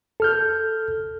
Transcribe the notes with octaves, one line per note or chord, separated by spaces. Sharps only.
A4 F6 G6